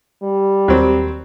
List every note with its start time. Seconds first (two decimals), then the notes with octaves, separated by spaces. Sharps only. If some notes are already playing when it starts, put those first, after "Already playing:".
0.23 G3
0.68 D#2 F#3 C4